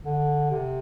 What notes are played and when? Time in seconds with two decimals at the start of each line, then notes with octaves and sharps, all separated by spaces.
0.04 D3
0.51 C3